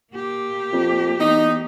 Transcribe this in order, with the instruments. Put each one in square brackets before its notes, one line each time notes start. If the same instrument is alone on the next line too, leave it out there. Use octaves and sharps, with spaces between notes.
[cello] A#3 G4
[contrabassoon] F2
[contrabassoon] E2 [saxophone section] D#4